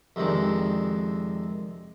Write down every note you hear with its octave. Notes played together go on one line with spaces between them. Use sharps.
F2 C3 D#3 G#3 D4